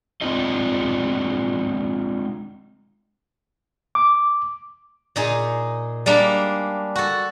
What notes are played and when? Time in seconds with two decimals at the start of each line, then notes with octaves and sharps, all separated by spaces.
0.21 G#3 C4 D4 D#4 F4 D#5
3.95 D6
5.16 A#2 D#4 G#4
6.06 G3 G#3 A#3 D4
6.95 F#4 A4